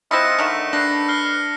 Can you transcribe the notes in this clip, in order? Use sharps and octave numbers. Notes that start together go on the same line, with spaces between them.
C4 E4 F4 D#5 B5 F#6 A#6 C#7
D3 D#3 A3
D4 B4 A#6 C7
F6 C7 G7